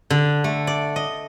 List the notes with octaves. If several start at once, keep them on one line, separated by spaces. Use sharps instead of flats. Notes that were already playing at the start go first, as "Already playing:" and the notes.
D3
A3
D5
D#5